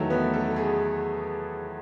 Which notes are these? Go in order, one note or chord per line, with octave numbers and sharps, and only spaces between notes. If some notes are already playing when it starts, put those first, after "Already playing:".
Already playing: E2 D#3 F#3 A3
B3
A4
G#4